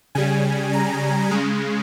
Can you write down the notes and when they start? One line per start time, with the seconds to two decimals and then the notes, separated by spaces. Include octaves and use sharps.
0.15 C#3 G3 G#5
0.73 A#5
1.31 C#3 G#3